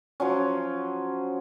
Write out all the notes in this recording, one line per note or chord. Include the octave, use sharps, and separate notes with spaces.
F3 F#3 C#4